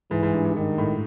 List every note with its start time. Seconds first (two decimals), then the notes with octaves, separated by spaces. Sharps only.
0.11 G#2 E3
0.23 G#2
0.33 G2
0.45 G2
0.56 G2 D#3
0.78 A2